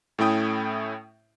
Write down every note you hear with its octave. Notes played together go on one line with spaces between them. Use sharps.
A2 A3 C#4 E4 G5 D#6